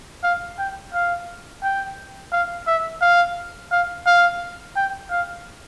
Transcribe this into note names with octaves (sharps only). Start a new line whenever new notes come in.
F5
G5
F5
G5
F5
E5
F5
F5
F5
G5
F5